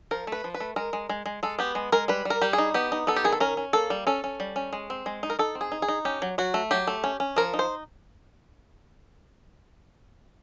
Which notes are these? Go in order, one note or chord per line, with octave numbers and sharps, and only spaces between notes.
F3 A#4
A3 B4
F3
B4
A3
G#3 A#4
G#3
G#3
G#3
G#3 A4
B3 G4
G#3
G#3 A#4
G3 B4
G3 A#4
G3 G4
G#4
D#4
B3 G4
D#4
B3 A4
G4
D#3 G#4
A4
C#4 A#4
C#4
A#3 A4
G3
C#4 A4
C#4
G3
C#4
G#3
C4
G#3
D#4
A#4
D#4 A4
C4
G#4
D#4
G#4
D#4
C#4 G4
F#3
F#3 F#4
A3
F#3 G4
A3
C#4
C#4
F3 A#4
D#4
C5